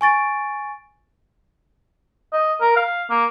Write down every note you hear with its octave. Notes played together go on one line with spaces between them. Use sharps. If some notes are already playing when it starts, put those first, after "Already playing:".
G#5 C#6 A6 D7
D#5
A#4
F5
A#3